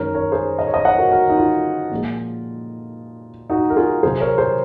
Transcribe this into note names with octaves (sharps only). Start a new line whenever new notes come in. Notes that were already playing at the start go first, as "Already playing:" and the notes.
Already playing: F#2 D#3 G#3 A#4 C#5
A#4 C#5
G#4 C5
D#5
C#5
C5 D#5
D#5 F#5
F#4 A#4
F#4 A#4
D#4
F4
A#2 F3 G#3
D#4 F#4
A#4
F4 G#4
C3 F#3 G#4 C5
A#4 C#5
G#4 C5